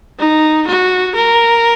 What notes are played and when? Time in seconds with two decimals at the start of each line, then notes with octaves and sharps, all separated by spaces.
0.19 D#4
0.67 F#4
1.15 A#4